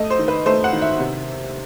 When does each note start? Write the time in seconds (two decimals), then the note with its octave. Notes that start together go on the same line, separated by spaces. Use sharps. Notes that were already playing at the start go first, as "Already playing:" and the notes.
Already playing: A3 D#5
0.10 C5
0.19 D#3
0.28 B4
0.46 A3 C5
0.64 F#5
0.73 D#3
0.82 E5
1.00 C3